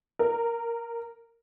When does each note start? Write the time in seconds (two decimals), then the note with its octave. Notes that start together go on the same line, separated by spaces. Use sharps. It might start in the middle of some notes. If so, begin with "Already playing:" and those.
0.19 A#4